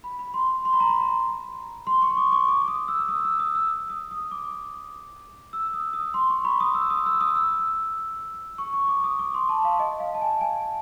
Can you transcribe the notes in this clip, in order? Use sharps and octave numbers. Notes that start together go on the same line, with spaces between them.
B5
B5
C6
C6
B5
A#5
B5
C6
C#6
D6
C#6
D6
D#6
E6
D#6
E6
D#6
E6
D#6
D#6
D6
E6
D#6
D#6
C6
C#6
B5
D#6
E6
D#6
E6
D#6
E6
C#6
C#6
D6
D#6
D6
C6
A5
F5
D#5
F5
A5
G#5
G#5